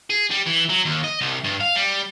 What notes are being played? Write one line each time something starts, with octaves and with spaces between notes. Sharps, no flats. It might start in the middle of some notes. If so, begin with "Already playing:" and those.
G#4
G3
E3
F#3
D#2
D#5
C2
G2
F5
G3